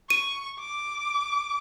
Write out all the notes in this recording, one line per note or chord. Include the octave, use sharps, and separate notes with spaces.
C#6 D#7
D6